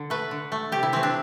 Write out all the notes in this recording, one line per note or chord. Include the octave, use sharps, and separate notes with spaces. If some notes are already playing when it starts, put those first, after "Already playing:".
Already playing: D3
A3 B4
D3
A3
C3 G4
E4
E3 A3 C4
D4